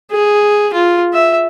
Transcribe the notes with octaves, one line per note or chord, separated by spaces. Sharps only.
G#4
F4
E5